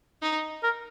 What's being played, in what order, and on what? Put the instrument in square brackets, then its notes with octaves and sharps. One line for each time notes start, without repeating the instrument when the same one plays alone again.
[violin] D#4
[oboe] A#4